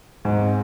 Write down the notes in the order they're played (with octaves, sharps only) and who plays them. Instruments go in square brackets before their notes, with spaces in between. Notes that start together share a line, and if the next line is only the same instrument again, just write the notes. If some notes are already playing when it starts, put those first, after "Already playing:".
[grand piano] G#2 [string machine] C4